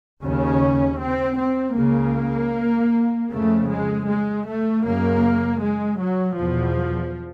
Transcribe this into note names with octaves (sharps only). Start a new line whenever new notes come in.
D#2 C#3 C#4
C4
C4
C#2 C#3 A#3
F2 C#3 A3
G#3
G#3
A3
F#2 C#3 A#3
G#3
F#3
E2 B2 F3